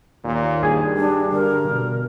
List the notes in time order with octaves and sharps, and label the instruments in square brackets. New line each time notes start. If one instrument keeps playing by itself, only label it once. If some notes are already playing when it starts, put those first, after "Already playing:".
[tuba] D#2 [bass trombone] A#2
[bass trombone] G2 [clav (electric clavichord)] G#4 G#5
[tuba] G3 [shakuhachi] D4
[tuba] D3 [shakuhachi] A#4
[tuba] B2